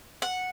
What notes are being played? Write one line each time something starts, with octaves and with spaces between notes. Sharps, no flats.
F#5